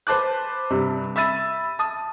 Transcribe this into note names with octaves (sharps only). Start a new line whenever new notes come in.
B4 C5 A5 D6 F#6
G2 C3 G3
E5 B5 E6 A6 D#7
A5 D#6